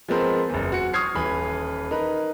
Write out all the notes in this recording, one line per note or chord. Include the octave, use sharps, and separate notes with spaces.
F3 G#3 B3 C4 A#4 C5
F#1 E2
F#4 C#7
C#6 D#6 F6 G#6 C7
D#1 E3 B5
D#4 A#4 B4